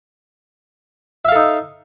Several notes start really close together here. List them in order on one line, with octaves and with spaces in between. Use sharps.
E5 F5 A4 D#4